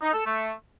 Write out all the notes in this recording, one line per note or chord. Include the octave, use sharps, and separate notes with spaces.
D#4
A4
A3